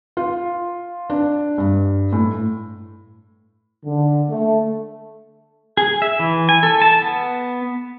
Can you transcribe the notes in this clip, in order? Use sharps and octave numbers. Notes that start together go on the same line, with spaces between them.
F4
D4
G2
A2
D3
A3
G#4
E5
E3
G#5
A4
A5
B3